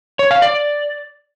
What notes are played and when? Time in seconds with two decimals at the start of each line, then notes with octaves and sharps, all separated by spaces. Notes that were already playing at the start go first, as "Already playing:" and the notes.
0.19 C#5
0.31 F5
0.42 D5